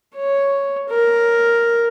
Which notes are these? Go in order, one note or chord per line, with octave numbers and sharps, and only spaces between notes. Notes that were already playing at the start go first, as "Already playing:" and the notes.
C#5
A#4